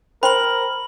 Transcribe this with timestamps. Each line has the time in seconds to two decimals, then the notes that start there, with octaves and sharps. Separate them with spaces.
0.23 A#4 C5 G5 B5 C6 F#7